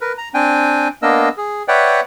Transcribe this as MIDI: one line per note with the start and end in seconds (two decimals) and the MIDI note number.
0.01 0.12 70
0.01 0.12 71
0.18 0.29 82
0.34 0.88 60
0.34 0.88 62
0.34 0.88 79
0.34 0.88 80
1.02 1.29 58
1.02 1.29 59
1.02 1.29 62
1.02 1.29 70
1.02 1.29 75
1.02 1.29 88
1.37 1.63 68
1.68 2.01 71
1.68 2.01 73
1.68 2.01 74
1.68 2.01 76
1.68 2.01 78
1.68 2.01 79